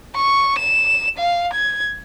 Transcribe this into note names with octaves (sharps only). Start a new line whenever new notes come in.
C#6
E7
F5
G#6